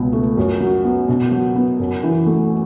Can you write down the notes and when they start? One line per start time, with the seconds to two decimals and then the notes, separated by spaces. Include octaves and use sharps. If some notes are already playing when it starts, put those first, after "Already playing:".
Already playing: C#2 B2
0.13 A3
0.37 F#2
0.60 F#3
0.85 B3
1.08 B2
1.31 F#3
1.56 B3
1.79 F#2
2.03 E3
2.26 A3